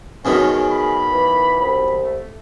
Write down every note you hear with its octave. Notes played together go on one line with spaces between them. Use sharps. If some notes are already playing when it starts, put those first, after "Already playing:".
F#2 B2 D#3 G#4 C#5
B5
E3
C2 B5
A3